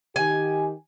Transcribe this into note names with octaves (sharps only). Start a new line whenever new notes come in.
D#3 G4 G#5